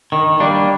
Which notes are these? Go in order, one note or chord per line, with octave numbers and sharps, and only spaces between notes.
D#3
G3 A#3 D4